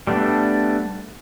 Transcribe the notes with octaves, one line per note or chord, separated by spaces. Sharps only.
G3 A3 B3 D4